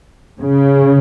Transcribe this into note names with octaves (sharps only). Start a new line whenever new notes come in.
C#3